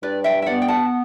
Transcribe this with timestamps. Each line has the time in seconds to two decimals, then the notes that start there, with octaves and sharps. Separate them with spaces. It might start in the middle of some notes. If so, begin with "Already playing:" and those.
0.03 G2 B4 D5
0.24 E5 G5
0.42 E5
0.46 B3 D5 F#5
0.62 G5
0.68 F#5 A5